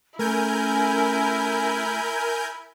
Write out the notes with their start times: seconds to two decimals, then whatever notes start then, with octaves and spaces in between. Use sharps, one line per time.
0.19 A3 C#4 E4 A#4 G#5 G6